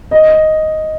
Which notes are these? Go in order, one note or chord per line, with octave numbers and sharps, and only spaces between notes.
D#5